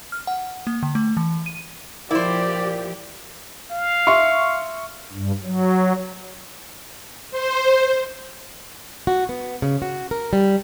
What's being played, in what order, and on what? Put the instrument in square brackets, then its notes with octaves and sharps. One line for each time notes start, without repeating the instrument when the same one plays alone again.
[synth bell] F6
F#5
A#3
D3
A3
E3
D#7
[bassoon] A#2 [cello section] F3 G4 [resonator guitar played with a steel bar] E4 C5 [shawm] D5
[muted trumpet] F5
[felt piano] E5 C6 C#6
[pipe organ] G2
F#3
[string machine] C5
[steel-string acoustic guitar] F#4
B3
C#3
F#4
A#4
G3